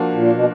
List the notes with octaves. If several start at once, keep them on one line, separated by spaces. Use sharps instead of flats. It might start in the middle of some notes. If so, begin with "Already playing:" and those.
Already playing: F3 A#3 D4 F#4
A#2
B2